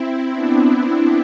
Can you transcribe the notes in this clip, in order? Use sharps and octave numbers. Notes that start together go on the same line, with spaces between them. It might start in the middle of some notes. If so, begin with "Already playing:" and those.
Already playing: C4 E4
B3 D4